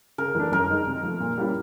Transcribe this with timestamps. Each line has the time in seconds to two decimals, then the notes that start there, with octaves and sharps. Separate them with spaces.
0.18 C#3 A#4
0.35 E3 A3 D4
0.52 F#2 A#4
0.70 D#3 G#3
0.87 C3
1.03 F3 A3
1.20 A#2
1.37 G3 A#3 C#4 E4